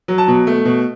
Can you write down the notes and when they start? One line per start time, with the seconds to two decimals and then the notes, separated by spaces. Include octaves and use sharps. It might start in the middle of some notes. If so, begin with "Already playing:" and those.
0.08 F#3
0.18 A5
0.28 B2
0.47 A3
0.65 B2